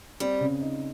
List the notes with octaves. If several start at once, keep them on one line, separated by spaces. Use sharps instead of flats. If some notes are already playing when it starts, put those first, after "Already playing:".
G3 C4
C#3
D#4